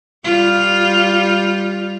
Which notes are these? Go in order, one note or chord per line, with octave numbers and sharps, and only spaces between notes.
G3 F4